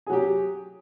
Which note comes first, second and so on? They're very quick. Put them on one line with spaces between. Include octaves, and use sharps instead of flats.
G#4 F#3 G4